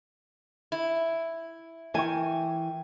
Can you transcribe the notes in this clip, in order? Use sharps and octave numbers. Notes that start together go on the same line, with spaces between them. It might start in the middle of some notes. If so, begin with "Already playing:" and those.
E4
E3 A#4 G5 G#5 C#6